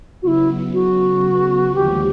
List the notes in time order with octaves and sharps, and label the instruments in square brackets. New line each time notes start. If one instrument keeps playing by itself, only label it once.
[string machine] C#3 F#3 B3 [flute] E4 F#4
[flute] F#4
[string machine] D#2 D3 F3 G#3 [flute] G4